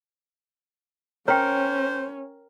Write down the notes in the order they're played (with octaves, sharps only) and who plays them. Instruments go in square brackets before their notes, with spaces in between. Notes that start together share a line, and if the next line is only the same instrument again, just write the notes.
[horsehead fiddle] C#4 [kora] A#4 [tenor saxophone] C5 [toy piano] C#5 G5